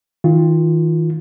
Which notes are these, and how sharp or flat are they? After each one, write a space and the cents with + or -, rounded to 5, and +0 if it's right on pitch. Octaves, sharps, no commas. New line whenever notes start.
D#3 +40 F4 +0